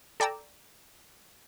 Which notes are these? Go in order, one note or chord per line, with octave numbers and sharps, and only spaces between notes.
A4 D5 G5 A#5 E6